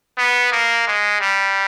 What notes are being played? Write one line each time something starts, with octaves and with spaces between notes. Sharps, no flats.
B3
A#3
G#3
G3